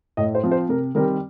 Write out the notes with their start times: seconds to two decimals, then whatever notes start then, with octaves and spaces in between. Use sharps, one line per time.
0.17 A2 D#5
0.35 C5
0.43 F3 C4
0.52 C5
0.69 C3 A#4
0.95 D#3 G3 C4 A#4